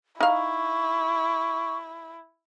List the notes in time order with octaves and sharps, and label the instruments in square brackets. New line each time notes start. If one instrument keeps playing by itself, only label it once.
[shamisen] D#4 F5 [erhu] E4 [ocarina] C#6